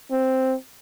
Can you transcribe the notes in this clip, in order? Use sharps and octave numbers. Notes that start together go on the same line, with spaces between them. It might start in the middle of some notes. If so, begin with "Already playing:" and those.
C4